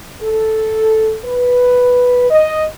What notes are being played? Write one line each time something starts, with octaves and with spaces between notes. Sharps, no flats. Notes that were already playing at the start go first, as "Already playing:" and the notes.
A4
B4
D#5